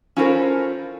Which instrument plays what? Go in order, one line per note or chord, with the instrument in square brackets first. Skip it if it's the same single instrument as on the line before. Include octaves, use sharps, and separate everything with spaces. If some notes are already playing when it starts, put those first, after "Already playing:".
[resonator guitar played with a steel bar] C#4 E4 F4 A4 A#4 C5